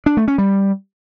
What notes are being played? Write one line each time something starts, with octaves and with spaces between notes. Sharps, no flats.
D4
A3
C#4
G3